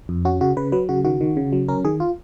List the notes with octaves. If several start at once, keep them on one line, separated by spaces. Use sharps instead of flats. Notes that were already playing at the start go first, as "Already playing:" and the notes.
F2
C#4 F#4
C#3 F#4
C#3 B4
F#3 B4
C#3 F#4
D#3 F#4
D#3
C#3
F#3
C#4 A#4
D#3 G#4
F4